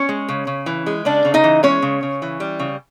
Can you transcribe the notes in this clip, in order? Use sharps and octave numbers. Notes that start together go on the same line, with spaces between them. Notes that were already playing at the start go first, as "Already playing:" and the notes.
Already playing: C#4 C#5
G#3
C#3
C#3
E3
G#3
C#3 D4 D5
C#3
D#4 D#5
E3
G#3 C#4 C#5
C#3
C#3
E3
G3
C#3